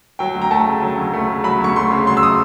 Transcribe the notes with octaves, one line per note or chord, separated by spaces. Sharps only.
F#3 G5
D2
A#5
A3 A5
C#3
F#3
D2
A3
C#3
F#3 B5
D2 C#6
A3 C6
C#3
F#3 C6
E6
D#6